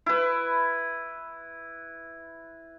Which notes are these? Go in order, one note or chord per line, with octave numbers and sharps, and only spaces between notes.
E4 B4